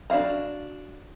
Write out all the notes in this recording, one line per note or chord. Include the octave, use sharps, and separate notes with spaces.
D4 F#4 F5 A#5